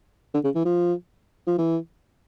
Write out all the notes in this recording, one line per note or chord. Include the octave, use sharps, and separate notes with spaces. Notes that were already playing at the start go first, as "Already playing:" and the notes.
D3
C#3
E3
F3
F3
E3